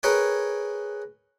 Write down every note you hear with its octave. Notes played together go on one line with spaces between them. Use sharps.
G#4 A#4 B4 C#5 G5